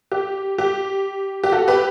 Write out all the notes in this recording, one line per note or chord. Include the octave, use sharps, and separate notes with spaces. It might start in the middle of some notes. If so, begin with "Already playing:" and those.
G4
G4
G4
F#4 A4
G4 B4